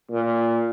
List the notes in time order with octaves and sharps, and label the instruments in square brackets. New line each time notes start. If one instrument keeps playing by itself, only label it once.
[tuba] A#2